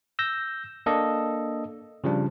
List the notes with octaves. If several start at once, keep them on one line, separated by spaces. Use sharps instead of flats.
E6 G6 A#6
A#3 D4 A4 D#5
C#3 F3 G3 D4